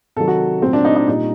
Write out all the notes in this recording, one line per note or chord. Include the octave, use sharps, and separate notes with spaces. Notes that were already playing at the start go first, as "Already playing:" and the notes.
C3 D#3 F#3 A4
F#4
A#2 F#3 A3 C4
D4
D#4
D#4
A#2 G3 D#4